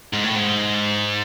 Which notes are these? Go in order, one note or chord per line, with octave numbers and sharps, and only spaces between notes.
G#2
A2
G#2